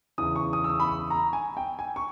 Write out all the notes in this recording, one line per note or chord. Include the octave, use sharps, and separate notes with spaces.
E2 C#3 E3 D#6
C#6
D#6
E6
D#6
B5
C#6
A#5
G#5
G5
G#5
C#6